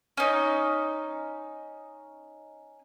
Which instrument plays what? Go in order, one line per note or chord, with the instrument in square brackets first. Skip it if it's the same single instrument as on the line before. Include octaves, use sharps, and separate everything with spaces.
[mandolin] C#4 D#4